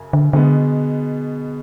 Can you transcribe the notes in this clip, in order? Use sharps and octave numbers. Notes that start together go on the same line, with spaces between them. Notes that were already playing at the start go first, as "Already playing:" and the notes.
Already playing: F#2 C#3
D3
B2 D3 G#3 B3